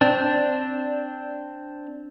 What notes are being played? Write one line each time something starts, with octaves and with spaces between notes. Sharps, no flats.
C4 D4